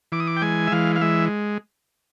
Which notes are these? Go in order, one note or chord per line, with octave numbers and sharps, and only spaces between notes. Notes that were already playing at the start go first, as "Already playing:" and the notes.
E3 D6
D#6
D6
G5
G#3 G#5
E5
E3 F5
F5
G#3 E5